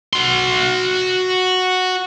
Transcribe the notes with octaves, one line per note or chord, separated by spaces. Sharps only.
F#4 C6